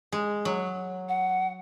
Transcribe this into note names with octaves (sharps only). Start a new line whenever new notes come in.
G#3
F#3
F#5